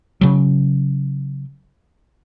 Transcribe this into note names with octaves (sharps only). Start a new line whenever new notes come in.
C#3 F#3